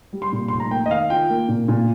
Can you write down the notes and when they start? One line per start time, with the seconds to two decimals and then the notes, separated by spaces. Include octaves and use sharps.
0.13 G3
0.22 C6
0.32 A#2
0.48 F1 C6
0.60 A#5
0.71 A#3 G5
0.86 D#5
0.91 D#3 F5
1.10 F4 G5
1.30 A#3
1.48 A#2
1.68 A#2